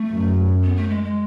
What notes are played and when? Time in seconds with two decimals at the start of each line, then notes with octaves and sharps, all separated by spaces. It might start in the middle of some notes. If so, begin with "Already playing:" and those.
Already playing: A3
0.09 F#2
0.63 B3
0.77 A3
0.90 G#3
1.04 G#3